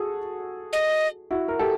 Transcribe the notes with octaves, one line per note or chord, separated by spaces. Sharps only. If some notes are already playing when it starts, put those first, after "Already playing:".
Already playing: F#4 G#4 A4
D#5
E4 F#4
A#4
G4 A4